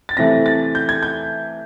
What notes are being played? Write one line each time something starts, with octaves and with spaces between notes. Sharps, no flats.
A6
C3 E3 A3 C4 A#6
A6
G6
G#6
G6